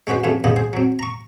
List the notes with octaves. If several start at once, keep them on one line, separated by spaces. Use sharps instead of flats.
G#3 C#4 F#4 B4 C5
A1 F2 C#3 E3 A3
E2 C#3 B3 F4 G4 D#5
G#4 C5
F#3 C4
A#5 C#6